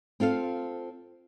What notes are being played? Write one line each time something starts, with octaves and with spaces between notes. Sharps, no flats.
C4 F4 A4 F5